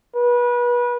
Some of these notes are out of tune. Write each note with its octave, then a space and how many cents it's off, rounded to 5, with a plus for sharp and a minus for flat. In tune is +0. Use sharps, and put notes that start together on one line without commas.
B4 -30